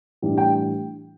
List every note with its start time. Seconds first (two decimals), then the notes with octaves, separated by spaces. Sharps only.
0.22 A2 E3 G3 D4
0.37 G5